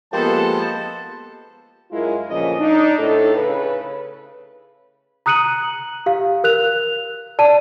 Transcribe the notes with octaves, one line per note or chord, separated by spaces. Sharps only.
F3 G#3 A#3 B3 G4 A4 C5 A5
F#2 G#3 E4 F4 A#4
D2 A#2 C#3 F3 D#5
D4 D#4
A2 A4
C#3 B4
A#5 D#6 F#6 C#7 D#7 F#7
G4 F5
A#4 F#6 F7
D5 A5 D#7